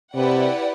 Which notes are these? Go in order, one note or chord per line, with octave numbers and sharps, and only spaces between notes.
C3 E4 G4 B4 D5 F#5